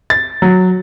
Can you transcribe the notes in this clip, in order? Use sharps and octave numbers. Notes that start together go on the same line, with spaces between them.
A6
F#3